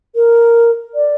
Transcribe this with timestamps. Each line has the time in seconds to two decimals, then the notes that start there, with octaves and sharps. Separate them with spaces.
0.16 A#4
0.95 D5